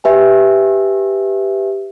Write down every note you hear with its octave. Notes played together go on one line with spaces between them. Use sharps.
G4 B4 E5 G#5